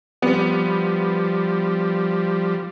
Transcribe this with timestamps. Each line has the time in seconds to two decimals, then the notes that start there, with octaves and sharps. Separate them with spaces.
0.22 F3 G3 B3